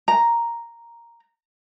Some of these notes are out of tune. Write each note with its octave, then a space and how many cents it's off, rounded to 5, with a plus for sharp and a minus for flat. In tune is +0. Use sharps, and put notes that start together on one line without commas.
A#5 +0